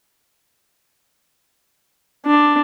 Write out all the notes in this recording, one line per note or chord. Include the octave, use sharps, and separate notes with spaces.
D4